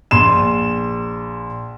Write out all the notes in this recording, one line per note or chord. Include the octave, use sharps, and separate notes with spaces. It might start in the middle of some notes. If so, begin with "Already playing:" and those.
A#1 C6 E7